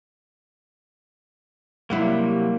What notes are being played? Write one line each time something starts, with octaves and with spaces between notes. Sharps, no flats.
C3 F#3 G3 A#3 E4